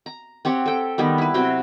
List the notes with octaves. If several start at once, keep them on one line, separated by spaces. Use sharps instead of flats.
A#5
C4 G4 C#5 F#5
A4 G5
D#3 G3 B3 B5
E4 B4
C3 F#3 F#4 G5